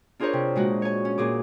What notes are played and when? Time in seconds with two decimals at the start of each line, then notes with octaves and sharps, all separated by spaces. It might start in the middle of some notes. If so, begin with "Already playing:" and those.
0.20 D4 F4 G#4 A#4 C5 C#5
0.33 C3
0.55 A#2 G#3 F#4
0.82 C#5 G#5
1.05 C#4
1.18 A#2 G#4 D6